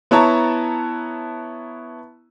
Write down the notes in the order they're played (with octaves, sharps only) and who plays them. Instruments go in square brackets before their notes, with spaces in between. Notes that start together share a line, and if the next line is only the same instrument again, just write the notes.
[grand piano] B3 E4 C#5 A5 A#5